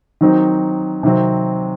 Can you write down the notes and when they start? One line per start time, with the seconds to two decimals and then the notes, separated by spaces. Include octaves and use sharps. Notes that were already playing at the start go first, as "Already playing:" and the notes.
0.21 D#3 F#3 C4 D#4
1.03 C3 D#3 F#3 C4